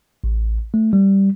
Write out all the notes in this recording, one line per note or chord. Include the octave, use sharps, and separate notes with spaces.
A1
A3
G3